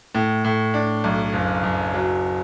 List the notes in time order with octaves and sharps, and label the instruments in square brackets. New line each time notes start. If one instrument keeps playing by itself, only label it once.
[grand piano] A2
A2
D4
B1
F#1
F#1
F#3